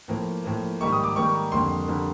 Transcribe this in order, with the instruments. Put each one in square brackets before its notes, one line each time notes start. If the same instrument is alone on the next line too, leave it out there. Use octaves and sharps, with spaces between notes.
[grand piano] A2 F3 A#3
A2 F3 A#3
G#2 D#3 G3 A#3 C#6
D#6
D6
G#2 D#3 G3 A#3 C#6
F2 D3 G3 A#3 C6
D3 G3 A#3